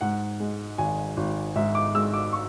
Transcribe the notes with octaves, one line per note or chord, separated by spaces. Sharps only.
G#2 F#5
G#3
G#1 G#5
G#1
G#2 E5
D6
G#3 E6
D6
C#6